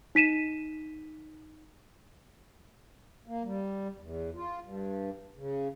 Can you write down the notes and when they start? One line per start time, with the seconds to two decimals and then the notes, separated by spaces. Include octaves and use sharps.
0.15 D#4 B6 D#7 E7
3.27 A#3
3.44 G3
3.99 E2
4.35 F4
4.62 G2
5.37 C#3